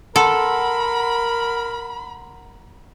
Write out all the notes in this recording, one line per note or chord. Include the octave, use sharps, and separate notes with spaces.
A4 A#4 F#5 B5 C6